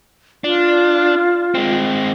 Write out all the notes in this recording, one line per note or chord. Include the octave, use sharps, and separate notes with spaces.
D4 F4
G#3 C4